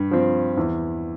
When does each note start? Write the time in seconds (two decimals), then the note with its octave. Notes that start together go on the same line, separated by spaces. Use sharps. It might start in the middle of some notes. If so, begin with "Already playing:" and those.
Already playing: G2
0.11 F3 C4
0.57 E2